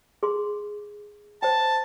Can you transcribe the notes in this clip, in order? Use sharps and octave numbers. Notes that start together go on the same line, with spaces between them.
G#4 C6
C5 G5 A5